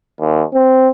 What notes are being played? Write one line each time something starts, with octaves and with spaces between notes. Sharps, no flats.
D#2
C4